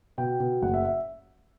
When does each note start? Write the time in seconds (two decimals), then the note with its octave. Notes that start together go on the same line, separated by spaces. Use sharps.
0.18 B2 G5
0.40 B2
0.62 F#1 F#5
0.74 E5
0.85 E5